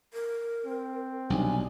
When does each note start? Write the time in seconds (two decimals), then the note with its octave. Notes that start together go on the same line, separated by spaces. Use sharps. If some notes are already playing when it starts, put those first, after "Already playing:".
0.14 A#4
0.65 C4
1.30 B1 C3 G3 D4 G#5